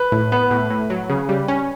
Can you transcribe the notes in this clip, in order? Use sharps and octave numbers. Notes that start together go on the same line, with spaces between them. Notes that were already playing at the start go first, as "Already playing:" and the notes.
Already playing: B4
A2
B3 B4
A2
A2
F#3
C#3
G3
C#4